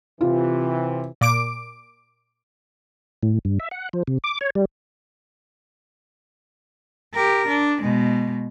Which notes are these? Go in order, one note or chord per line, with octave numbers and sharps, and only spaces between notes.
C3 E3 F4
A#2 D6 D7
A2
G2
E5
F#5
F3
C3
D6
C#5
G3
G4 A#4
D4
B2 G#3